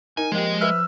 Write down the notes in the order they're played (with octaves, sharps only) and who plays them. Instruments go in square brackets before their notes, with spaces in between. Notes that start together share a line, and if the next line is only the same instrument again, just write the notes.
[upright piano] D#4 [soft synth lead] A#4 [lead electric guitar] G#5
[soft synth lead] F3 [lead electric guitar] G#3 D#5 [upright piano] A#3 G4
[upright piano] B4 E5 F6 [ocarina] E6